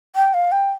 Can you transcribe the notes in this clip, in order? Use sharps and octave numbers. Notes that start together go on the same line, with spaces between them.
G5
F5
G5